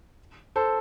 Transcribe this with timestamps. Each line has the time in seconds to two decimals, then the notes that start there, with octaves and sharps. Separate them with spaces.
0.56 A4 C5